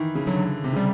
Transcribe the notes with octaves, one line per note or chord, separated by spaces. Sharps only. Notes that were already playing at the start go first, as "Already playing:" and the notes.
Already playing: D#3 E3
C#3
D3 F#3
C3
C#3 G3